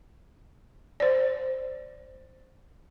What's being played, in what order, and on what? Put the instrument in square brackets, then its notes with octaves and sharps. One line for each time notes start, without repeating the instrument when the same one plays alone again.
[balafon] C5 D5